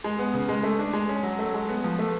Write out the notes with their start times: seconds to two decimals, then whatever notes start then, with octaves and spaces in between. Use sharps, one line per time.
0.04 G#3
0.19 B3
0.34 C#3
0.49 G#3
0.63 A3
0.79 D4
0.93 G#3
1.09 C#4
1.23 F#3
1.39 A3
1.54 G#3
1.69 B3
1.84 F3
1.99 A3